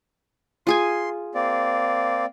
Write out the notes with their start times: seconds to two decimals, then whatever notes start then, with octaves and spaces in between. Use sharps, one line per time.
0.67 F4 G#4 G#5 C6
1.35 A#3 C4 D5